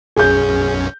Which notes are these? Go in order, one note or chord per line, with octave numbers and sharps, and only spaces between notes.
B1 F#2 C#4 G#4 G6